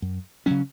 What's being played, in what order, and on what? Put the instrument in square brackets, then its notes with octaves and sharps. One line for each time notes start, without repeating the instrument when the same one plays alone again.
[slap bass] F#2
C#3 F#3 C#4